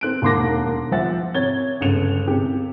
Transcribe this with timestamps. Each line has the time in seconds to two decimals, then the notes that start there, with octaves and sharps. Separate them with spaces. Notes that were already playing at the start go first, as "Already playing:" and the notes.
0.01 C4 F#6 D7
0.22 E1 D#2 A#3 C6 D6 A#6
0.91 F3 C5 E5 F#5 A6
1.34 C3 C#5 G#6 A6 G7
1.81 G1 C#2 C#7 F7
2.27 C3 G4